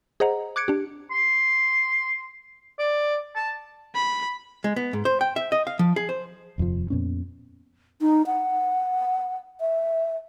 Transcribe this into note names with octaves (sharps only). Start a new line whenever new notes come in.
G#4 C5 D#5 F#5 A#5
D6 F#6 G#6 C#7 D7
D4 G4
C6
D5
A5
B5
G#3
B3
G#2
C5
G5
E5
D#5
F5
F3
G#4
C5
D#1 F2 C3 F3
F2 A#2 B3 C#4
D#4
F#5
E5